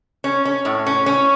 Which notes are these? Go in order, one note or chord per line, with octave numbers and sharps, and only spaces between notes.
C#4
C#4
A2
C#4
C#4